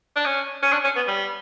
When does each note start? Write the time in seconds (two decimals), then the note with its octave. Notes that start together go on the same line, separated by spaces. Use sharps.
0.16 D4
0.26 C#4
0.62 C#4
0.72 D4
0.84 C#4
0.96 B3
1.07 G3